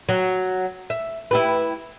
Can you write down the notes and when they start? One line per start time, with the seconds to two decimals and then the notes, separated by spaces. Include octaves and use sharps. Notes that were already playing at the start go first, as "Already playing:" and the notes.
0.09 F#3
0.90 E5
1.31 E4 G4 B4